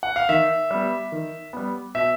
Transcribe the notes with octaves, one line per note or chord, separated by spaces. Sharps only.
F#5
F5
D#3 E5
G3 B3
D#3
G3 B3
B2 E5